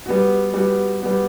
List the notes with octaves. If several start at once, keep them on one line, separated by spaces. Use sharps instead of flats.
G3 B3 F#4
G3 B3 F#4
G3 B3 F#4